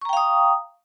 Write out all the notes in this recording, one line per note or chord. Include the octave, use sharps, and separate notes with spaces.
F5 G5 A#5 C#6 D#6